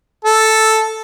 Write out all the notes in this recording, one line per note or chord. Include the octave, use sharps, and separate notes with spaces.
A4